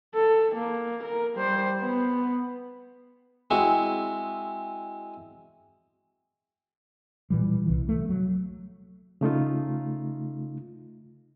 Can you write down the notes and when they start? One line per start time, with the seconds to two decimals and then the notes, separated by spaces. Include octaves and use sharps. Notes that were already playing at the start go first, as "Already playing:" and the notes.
0.15 A4
0.55 A#3
1.03 A#4
1.35 G3 C5
1.82 B3
3.51 G#3 C4 E4 F#4
7.30 A#2 E3 G3
7.66 C2 E3
7.89 A3
8.09 F#3
9.21 C#3 A3 D#4 F4